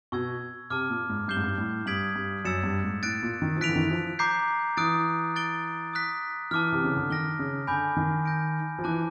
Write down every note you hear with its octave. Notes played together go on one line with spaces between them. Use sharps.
B2 C#6 E6 G#6
C3 A5 D6 F6
A#2
G#2
G2 D6 G6 C7 E7 G7
G#2
G2
A2
G2 D#6 G#6 B6 D7 F#7
G2
F#2 E6 A6 C#7 E7
G2
G#2
A2 F#6 A6 D7
A#2
D#3
F3
E3 F#6 B6 D7 F7
D3
D#3
E3
F3
A#5 D6 G6 C7
E3 D#6 F#6 A6 D7
F#6 A6 D7 G7
D#6 F#6 B6
E3 A5 D6 F6
C3
C#3
D3
D#3 F6 A#6 D7 G7
C#3
D3 G#5 B5 D6 G6
D#3
G6 A#6 D7
F3
E3 A5 D6 F#6